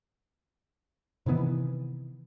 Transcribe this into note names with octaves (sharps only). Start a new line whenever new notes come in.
C3 D#3 E3 B3